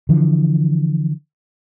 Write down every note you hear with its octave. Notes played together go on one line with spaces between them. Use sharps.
D3 E3 F3